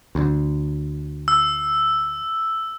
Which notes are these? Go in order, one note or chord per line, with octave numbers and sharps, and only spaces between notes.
D2 D3
E6